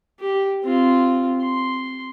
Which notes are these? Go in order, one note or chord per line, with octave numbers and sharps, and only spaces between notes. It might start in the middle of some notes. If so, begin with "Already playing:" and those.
G4
C4 F4
C6